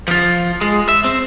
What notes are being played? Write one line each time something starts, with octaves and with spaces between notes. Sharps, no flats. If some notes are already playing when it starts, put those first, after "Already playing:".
F3 F4
G#3
E5
C4